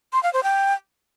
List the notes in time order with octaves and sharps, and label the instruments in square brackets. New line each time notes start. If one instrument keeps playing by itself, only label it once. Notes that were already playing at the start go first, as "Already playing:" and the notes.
[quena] C6
F5
C5
G5